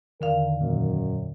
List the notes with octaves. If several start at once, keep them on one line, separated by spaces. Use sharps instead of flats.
E2 D3 D#3 A#4 F5
F#2 A#2